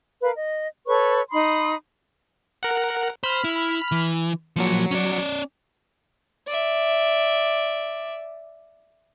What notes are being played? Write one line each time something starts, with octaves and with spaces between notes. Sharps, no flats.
A#4 B4 F5
D#5
A4 B4 C#5 C#6
D#4 B5 C6 D#6
A#4 F#5
C5 B5 F6
E4
E3
F3 F#3 A#3 C#7
C#4 D5
D5 E5